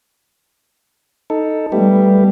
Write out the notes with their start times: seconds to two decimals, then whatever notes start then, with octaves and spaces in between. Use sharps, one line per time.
1.30 D#4 A4
1.72 G3 A3 B3 G4